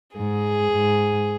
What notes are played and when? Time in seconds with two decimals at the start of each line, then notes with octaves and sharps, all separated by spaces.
0.16 G#2 G#4
0.72 G#2